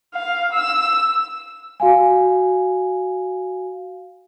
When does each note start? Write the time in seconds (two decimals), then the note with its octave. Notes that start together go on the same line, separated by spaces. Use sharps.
0.14 F5
0.53 E6
1.80 F#4 F5 G#5